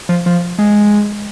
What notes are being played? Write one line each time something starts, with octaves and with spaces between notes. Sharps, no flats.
F3
F3
G#3